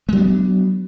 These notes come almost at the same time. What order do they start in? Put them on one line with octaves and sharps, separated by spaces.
G#3 F#3 D4 B3